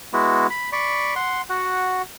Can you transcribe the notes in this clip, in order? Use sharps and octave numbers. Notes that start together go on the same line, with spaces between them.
G#3 B3 E4 F#4
B5
D5 B5 C#6
F#5 C6
F#4 F#5